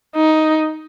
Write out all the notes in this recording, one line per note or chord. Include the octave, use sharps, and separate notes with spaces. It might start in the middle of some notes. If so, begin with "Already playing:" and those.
D#4